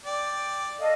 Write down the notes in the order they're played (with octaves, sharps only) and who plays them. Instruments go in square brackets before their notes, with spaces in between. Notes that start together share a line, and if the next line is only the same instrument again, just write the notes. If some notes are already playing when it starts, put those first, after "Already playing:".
[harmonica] D5 G5
[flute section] A4 D#5 F5